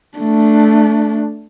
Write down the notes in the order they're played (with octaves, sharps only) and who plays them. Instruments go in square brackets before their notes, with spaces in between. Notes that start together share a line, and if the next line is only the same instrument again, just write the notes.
[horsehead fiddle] A3 D4